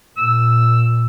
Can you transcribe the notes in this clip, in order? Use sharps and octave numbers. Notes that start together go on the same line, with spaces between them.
A#2 E6